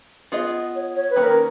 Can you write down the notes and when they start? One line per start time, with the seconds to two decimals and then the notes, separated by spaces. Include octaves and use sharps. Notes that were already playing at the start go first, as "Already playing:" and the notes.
0.32 B3 F4 G#4 D#5
0.74 C#5
0.95 C#5
1.10 B4
1.16 D#3 A#3 C#4
1.23 A#4